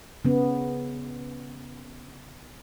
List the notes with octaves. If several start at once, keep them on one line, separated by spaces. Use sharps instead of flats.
C#3 B3